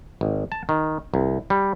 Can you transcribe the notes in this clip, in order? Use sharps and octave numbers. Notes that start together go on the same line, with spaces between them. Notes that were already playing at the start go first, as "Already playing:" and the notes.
G#1
A5
D#3
C2
G3